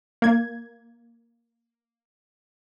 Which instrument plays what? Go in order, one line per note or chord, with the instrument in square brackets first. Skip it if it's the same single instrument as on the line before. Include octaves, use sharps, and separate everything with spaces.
[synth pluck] A#3 G#6